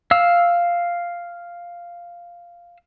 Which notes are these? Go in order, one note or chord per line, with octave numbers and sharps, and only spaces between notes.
F5 E6